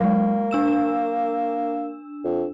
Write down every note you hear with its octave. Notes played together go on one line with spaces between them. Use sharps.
F#3 G#3 A#3
D4 E6 E7
F2